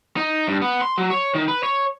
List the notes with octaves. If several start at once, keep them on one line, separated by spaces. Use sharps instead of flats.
D#4
G2
B3
C6
F#3
C#5
D#3
B4
C#5